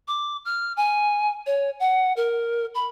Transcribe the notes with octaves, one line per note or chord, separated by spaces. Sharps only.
D6
F6
G#5
C#5
F#5
A#4
B5